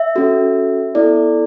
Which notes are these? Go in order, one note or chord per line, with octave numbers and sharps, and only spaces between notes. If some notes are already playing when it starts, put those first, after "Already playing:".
Already playing: E5
C#4 F#4 A4
B3 E4 A4 D5